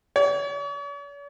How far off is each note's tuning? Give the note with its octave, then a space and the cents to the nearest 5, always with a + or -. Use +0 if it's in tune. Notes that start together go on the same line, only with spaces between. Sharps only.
C#5 +45